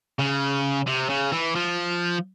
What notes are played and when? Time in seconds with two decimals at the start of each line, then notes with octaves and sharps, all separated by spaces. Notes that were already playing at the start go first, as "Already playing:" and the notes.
0.19 C#3
0.87 C3
1.10 C#3
1.32 E3
1.55 F3